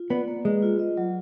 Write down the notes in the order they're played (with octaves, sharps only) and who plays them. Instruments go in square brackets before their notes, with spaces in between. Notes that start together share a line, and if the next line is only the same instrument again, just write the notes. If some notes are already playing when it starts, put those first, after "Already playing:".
Already playing: [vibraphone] F4
[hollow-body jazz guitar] B3 [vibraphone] D5
[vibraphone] A#3
[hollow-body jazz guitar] G#3 [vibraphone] B4
[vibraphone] F4
D#5
F#3